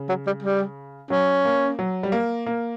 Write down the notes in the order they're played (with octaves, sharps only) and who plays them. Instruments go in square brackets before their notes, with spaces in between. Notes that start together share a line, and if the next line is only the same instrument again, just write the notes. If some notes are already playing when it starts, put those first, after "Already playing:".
Already playing: [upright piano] C#3
[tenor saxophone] F#3
G3
G3
[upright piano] F#3 [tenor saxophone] C#4
[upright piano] A#3
F#3
G3
A#3
A#3